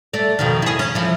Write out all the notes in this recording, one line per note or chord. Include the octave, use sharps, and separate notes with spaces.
A3 D5
F2 B2 D#3
E4 G#4
C#4
E3 F3